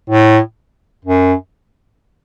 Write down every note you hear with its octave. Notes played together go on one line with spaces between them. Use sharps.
A2
F#2